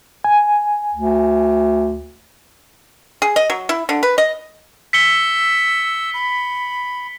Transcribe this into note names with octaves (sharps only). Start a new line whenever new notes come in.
G#5
D2
G#4
D#5
F#3
E4
D3
B4
D#5
E6 B6 C#7 G7
B5